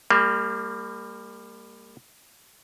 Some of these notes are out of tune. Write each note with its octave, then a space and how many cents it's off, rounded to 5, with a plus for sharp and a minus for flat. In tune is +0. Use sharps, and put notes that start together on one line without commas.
G3 +30 A#3 -25